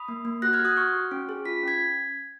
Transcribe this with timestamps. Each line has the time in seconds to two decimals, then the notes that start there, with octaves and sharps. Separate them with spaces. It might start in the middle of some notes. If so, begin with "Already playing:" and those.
Already playing: B5 D#6
0.08 A#3
0.25 A#3
0.42 F#4 F#6 A#6
0.53 F6 G#6
0.59 F#4
0.65 D#6 F#6
0.76 F#4 C#6 F6
0.95 F#4
1.11 C#4
1.29 G#4
1.45 F4 B6
1.63 C#4 G#6 B6